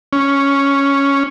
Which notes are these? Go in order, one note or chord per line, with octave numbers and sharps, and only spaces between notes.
C#4